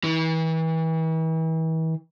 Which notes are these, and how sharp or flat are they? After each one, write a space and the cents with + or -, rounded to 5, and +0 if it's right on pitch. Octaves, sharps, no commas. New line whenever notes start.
E3 -35